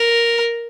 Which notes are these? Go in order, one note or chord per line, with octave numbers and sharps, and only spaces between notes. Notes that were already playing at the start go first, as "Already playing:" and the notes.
Already playing: A#4